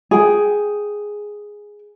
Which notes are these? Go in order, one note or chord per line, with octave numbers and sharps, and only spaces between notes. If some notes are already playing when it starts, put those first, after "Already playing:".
G#4 G5